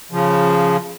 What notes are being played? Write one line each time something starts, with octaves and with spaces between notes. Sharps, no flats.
C#3 F3